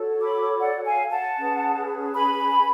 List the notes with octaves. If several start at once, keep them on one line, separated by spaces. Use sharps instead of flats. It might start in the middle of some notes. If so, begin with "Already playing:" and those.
Already playing: F#4 A4 C#5
B5 D6
D5 F#5
F5 G#5
F#5 A5
C#4 G#4 B4
G#5 B5